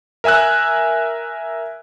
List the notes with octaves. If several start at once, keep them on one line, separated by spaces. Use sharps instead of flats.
A#4 E5 G#5 E6 F#6